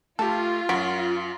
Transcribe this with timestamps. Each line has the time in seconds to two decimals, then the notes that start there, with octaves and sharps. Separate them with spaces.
0.19 A3 F4 G4 A4
0.69 F#2 F#4 B6 D7